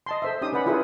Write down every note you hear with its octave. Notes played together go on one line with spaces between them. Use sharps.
D#5 A5 C6
A4 C5 E5
C#4 D#4 G4 D#6
C#4 B4 D5 F#5 B5
E4 F4 G4 G#4 A#4 B4